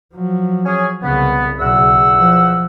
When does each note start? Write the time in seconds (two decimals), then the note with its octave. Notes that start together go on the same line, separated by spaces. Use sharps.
0.15 F3 F#3
0.66 C#4 G#4 G#5
1.03 C2 C#3 B3
1.60 B1 E2 C#3 F#5 E6
2.17 F3